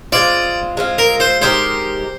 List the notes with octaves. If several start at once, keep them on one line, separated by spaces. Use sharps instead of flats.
G#3 C4 F4 D5
G#3 C4 F4
A#4
C5
G#3 D#4 G4 A#4 C5